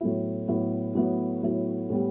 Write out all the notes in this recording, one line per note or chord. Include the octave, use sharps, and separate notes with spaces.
A2 F#3 B3 E4
A2 F#3 B3 E4
A2 F#3 B3 E4
A2 F#3 B3 E4
A2 G3 B3